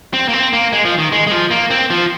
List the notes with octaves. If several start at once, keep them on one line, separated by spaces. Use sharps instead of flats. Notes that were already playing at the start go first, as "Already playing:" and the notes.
C4
A#3
C4
A#3
G#3
F3
D#3
G#3
G#3
F3
A#3
C4
F3